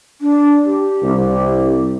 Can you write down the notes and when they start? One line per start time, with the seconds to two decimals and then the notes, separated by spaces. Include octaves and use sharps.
0.21 D4
0.65 G4
1.03 C2